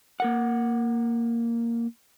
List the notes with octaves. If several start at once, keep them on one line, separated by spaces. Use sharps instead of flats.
A#3 A#4 F#5